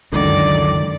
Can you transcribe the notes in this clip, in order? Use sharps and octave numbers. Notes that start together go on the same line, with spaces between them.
C#2 F#2 D3 D#3 D5